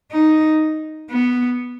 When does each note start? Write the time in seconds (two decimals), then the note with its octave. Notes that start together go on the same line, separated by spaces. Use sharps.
0.12 D#4
1.10 B3